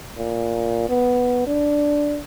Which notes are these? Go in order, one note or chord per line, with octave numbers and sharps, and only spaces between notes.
A#2
B3
D4